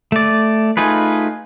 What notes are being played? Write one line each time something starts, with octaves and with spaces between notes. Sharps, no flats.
A3 D5
A3 D#4 F4 G#4 B4